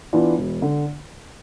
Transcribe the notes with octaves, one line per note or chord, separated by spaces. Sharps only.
E3 B3 D4 F4
E1
D3